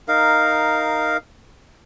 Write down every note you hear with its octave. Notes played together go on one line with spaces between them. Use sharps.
D#4 A#4 F5